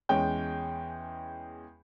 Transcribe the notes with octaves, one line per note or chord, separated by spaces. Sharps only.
E2 G#3 C#4 G5 G6